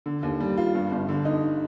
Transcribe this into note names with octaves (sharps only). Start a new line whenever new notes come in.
D3
D#2
G3
F4
G2
G1
D3
D#4